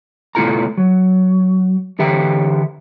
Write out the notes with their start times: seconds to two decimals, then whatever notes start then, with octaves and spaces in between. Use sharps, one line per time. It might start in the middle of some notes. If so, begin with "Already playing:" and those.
0.35 B2 A3 E4 F4 A4 A#5
0.77 F#3
1.99 D3 E3 G4 E5 G5 A#5